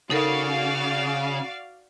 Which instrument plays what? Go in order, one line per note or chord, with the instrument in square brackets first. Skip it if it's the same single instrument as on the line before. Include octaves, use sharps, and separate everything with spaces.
[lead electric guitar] C#3 [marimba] D#4 A4 A#4 [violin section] F#4 D5 F5